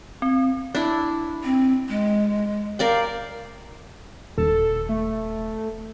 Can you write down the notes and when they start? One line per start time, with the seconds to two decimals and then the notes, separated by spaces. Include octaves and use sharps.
0.22 C4
0.75 D4 E4
1.44 C4
1.89 G#3
2.79 A#4 D5 F5 G5
4.38 D#1 A4
4.89 A3